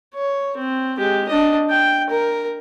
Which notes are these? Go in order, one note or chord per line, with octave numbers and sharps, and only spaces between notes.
C#5
C4
G#3 G4
D4 D#5
G5
A#4